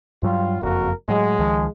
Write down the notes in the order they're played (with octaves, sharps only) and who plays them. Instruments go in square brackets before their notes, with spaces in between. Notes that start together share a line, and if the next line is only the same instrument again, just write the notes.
[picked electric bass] G2 F#3 G3 [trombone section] F4
[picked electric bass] F#1 F2 [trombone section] A#3 F#4 A#4
[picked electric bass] A2 F#3 [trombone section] G#3
[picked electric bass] C#2 D#3 F3